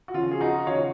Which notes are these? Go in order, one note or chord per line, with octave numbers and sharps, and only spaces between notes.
F#4
C#3 F3 F4
G#4
D#4 F#4
C#3 F3 C#5 F5